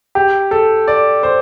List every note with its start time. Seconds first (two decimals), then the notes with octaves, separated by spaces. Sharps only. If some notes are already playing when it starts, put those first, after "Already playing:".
0.15 G4
0.51 A4
0.88 D5
1.23 C5